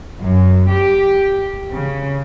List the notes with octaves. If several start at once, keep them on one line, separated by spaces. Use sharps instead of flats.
F#2
G4
C#3